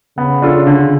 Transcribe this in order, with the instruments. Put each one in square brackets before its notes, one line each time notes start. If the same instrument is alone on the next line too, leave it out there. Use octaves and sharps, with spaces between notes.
[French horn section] C#3 [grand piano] B3
[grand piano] D4 F4 A4
D3